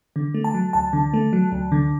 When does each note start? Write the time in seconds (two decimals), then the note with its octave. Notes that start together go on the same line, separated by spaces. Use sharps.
0.16 D3
0.34 A3
0.44 A5
0.54 F#3
0.73 D2 A5
0.93 D3
1.14 A3
1.33 F#3
1.52 D2
1.72 D3